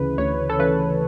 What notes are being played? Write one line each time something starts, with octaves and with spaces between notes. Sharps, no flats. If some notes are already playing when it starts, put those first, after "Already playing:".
Already playing: D2 C#3 E3 B4
D2 C#5
A4
C#3 E3 B4